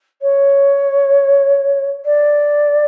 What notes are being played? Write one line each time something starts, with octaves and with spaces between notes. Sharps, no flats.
C#5
D5